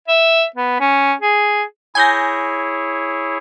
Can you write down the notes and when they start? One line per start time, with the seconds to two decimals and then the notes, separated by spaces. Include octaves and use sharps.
0.08 E5
0.56 B3
0.80 C#4
1.21 G#4
1.95 E4 G#4 C#5 G#5 G6 A#6